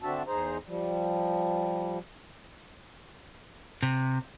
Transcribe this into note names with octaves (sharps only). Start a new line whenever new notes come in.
D3 C4 D4 F#4 E5 A5
E2 D#4 G#4 C5 A#5
F3 G3
C3